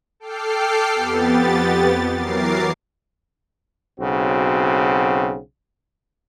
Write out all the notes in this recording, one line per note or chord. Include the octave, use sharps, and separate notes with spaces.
A4 G5 D6 F6 C7
F2 B3 G4 A6
E3 F#3 A#4 D6 A6 C7
B1 C#3 C4 F#4